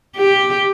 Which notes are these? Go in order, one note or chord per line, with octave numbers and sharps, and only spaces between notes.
G4